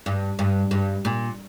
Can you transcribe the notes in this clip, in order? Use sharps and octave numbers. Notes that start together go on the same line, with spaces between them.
G2
G2
G2
A#2